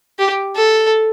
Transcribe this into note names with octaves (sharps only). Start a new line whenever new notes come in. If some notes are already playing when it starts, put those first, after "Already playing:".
G4
A4